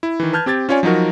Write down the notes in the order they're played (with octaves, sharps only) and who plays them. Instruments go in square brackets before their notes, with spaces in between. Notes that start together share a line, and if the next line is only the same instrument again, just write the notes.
[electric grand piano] E4
D#3 E3
B4 A5 F6 G6 G#6
C4 G4 G#6 A6
C#4 F4 C#5 D5 G#5
F3 F#3 D#4 F#4 A#4